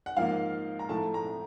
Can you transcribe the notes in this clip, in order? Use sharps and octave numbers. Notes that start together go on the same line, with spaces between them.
F#5
G#2 F3 A#3 F5
A#5
A2 F3 A3 A5
A#5